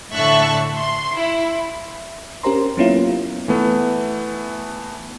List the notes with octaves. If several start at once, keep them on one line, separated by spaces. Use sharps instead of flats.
A2 D3 E5 A5 C#6 F#6
C6
E4
C#4 G4 A#4 C5 A#5 C6
F#3 A#3 B3 C#4 E4 F4
E3 A3 B3